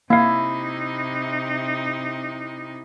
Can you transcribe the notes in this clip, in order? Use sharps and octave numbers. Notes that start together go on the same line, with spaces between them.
C3 A#3 D#4 E4 F5